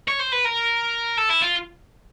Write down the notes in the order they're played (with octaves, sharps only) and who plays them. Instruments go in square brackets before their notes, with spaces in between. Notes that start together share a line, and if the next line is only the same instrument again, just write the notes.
[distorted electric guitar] C#5
C5
B4
A#4
A4
E4
F4